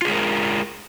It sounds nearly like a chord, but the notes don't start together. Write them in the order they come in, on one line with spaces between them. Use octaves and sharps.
F4 G#4 G#3 A#4